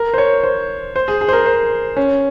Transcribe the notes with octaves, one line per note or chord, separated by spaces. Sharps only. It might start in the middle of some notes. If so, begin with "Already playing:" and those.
Already playing: A#4
C5
C#5
C5
C5
G#4
G#4
C5
A#4
C5
C#4